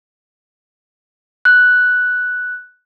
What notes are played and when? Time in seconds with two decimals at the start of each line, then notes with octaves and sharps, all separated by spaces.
1.45 F#6